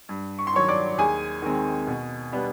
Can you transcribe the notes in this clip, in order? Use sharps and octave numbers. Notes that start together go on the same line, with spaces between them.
G2
C#6
C6
D#3 F#3 C#5 C#6
D5 D6
D#2 G#4 G#5
D#3 G#3 C4
B2
G3 B3 D4